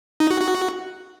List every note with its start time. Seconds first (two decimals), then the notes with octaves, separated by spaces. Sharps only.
0.20 D#4
0.31 F#4
0.41 F#4